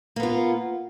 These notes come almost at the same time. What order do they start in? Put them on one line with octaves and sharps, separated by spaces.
A#3 B3 F4